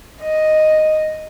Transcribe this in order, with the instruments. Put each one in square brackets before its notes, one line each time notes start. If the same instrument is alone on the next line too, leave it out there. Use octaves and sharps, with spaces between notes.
[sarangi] D#5